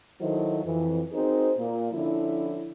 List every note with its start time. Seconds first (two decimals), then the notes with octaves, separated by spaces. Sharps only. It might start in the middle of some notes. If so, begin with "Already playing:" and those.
0.21 D#3 F#3 E4 A4 C5 D#5
0.64 F2 E3
1.12 C4 D#4 F#4 G#4 A#4 C5
1.58 A#2 A#3
1.92 D3 F3 C#4 E4